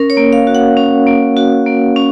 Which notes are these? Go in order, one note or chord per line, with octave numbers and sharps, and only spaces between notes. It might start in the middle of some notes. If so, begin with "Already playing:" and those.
Already playing: C#4 A#4
C#5
A#3
F5
F#4
F#5
C#4
A#3
F#4
A#3
C#4